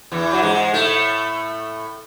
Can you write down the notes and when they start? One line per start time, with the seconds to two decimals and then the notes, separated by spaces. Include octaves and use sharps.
0.12 E2 E3
0.33 F#3
0.42 G#2 G#3
0.74 A2 A3